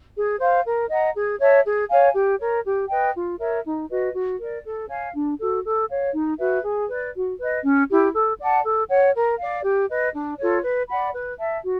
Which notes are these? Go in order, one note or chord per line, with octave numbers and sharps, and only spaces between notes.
G#4
C5 F5
A#4
D#5 F#5 A#5
G#4
C#5 E5 A5
G#4
C#5 F5 G#5
G4
A#4 C#5
G4
B4 D#5 G5
F4
A#4 C#5 E5
D#4
F#4 B4 D#5
F#4
A#4 D5
A4
C#5 F5 G#5
D4
F#4 A4
A4
C#5 F5
D#4
F#4 B4 E5
G#4
B4 D5
F#4
B4 D#5
C#4
E4 G4
A4
D5 F#5 A5
A4
C#5 F#5
A#4
D5 F5
G4
B4 D#5
D4
F4 A4 C#5
B4
D5 F#5 B5
B4
E5 A5
F#4